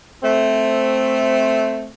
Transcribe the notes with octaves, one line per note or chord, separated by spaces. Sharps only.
A3 C4